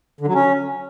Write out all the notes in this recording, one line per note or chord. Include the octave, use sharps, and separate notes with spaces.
D3
F#3
C#4